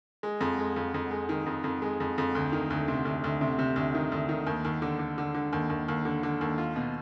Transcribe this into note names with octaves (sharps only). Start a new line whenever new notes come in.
G#3
F2
G#3
F2
F2
G#3
D#3
F2
F2
G#3
F2
F2
D2
D#3
D2
C3
D2
D2
C3
C3
D2
D#3
D2
D#3
D#2
D#2
D3
D3
D3
D3
D#2
D#2
D#2
D3
D3
D#2
F4
B2